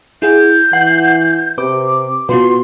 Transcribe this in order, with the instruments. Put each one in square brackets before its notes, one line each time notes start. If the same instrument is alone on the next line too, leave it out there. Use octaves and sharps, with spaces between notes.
[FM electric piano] E4 G#4 F#5 [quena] G6
[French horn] E3 [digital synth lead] F#5 [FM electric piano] C7
[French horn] C3 [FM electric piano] B4 [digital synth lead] D6
[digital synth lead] B2 [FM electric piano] B3 F4 B4 [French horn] F#4 [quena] C6